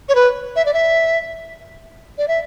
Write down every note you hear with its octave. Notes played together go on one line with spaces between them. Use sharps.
C#5
B4
E5
D5
E5
D5
E5